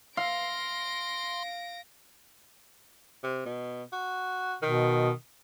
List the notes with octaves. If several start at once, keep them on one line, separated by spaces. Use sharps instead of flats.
F5 C6 A#6 D7
C3
B2
F#4
B2 D#3